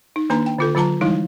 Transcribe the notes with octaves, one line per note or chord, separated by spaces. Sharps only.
D#4
D#3 A#3 D4 B4 A#5 C6
G5
D3 F4 A4
D3 F#3 F4 A5 A#5
E3 F3 G3 G#3 D#4 E4